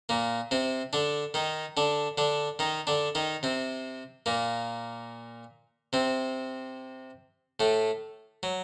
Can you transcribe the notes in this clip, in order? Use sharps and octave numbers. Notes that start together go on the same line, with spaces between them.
A#2 A#3
C3 C4
D3 D4
D#3 D#4
D3 D4
D3 D4
D#3 D#4
D3 D4
D#3 D#4
C3 C4
A#2 A#3
C3 C4
A2 A3
F#3